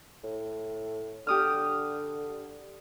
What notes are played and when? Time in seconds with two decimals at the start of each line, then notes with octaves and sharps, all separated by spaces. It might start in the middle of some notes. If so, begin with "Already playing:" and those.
0.24 A2
1.27 D3 G4 D#6 F6